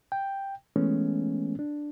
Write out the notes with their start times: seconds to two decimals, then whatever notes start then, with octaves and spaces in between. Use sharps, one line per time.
0.12 G5
0.76 E3 G#3 A3 B3 C#4
1.59 D4